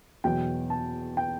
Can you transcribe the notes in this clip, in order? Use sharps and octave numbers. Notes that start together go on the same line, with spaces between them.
E2 B2 F#3 G5
A5
G5